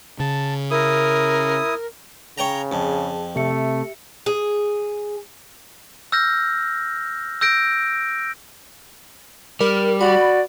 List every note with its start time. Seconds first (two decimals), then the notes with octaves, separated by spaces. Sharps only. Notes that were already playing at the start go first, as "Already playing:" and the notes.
0.20 C#3 A5
0.71 E4 A#4 D#6
2.38 C#3 C#5 G5 A#5
2.72 F2 G#4 A5
3.36 C3 A3 G4 E5 C#7
4.26 G#4
6.12 E6 F6 G6 A#6
7.41 E6 G6 A#6 D7
9.61 G3 A#4
10.01 F#4 D5 B5